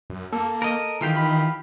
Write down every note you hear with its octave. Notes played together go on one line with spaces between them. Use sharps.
F#2
A#3 A4
A#4 D#5
D#3 E3 F4 G4
B5